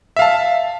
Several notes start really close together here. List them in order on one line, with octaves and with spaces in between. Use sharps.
E5 F5 A5